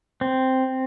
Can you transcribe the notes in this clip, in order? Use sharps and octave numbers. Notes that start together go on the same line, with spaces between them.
C4